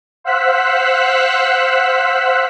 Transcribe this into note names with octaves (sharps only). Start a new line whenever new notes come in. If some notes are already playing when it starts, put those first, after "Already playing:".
C5 F5 F#5 E6 F#6 B6